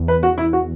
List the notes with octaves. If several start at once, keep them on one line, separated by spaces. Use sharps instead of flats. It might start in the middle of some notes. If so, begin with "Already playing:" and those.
Already playing: E2
B4
F#4
E4
F#4